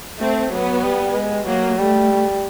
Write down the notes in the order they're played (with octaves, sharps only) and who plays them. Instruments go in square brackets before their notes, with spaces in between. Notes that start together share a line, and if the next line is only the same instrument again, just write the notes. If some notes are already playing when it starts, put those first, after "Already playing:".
[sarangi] A3 [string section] C4
[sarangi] F#3 [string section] B3
[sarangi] G3
G#3
[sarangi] F#3 [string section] A#3
[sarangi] G3 [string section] A3